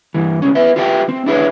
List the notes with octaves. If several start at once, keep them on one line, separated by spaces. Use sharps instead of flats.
G2 E3
C2 C#4
B3 B4 E5
F4 G4 B4 E5 F5 G5
C4
D4 E4 G#4 B4 C#5